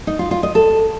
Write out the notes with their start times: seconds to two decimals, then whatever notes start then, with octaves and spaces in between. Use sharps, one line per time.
0.07 D#4
0.19 F4
0.31 F4
0.43 D#5
0.55 A4